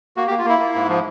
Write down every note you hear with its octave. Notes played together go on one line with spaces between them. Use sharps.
A#3 F#4
G4
A#3
F4
A#3 E4
A#3
G#2
F3